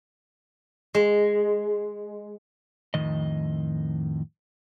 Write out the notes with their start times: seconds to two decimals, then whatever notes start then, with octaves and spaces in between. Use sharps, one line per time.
0.95 G#3
2.94 F2 A2 D#3 D#5